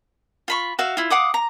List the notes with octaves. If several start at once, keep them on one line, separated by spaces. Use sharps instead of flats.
F4 B5 C#6
F#4 E5 F5
E4 F4
F5 F#5 D6 D#6
A#5